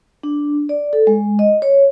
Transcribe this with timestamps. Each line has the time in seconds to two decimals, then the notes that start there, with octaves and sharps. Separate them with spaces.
0.23 D4
0.69 D5
0.93 A4
1.07 G#3
1.39 D#5
1.62 C#5